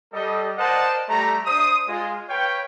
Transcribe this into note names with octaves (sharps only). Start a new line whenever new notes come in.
G3 A4 D#5
A#4 C5 D5 D#5 F#5 A5
G3 A3 E5 A#5
D4 C5 E5 D#6
G#3 F4
B4 C#5 F5 G5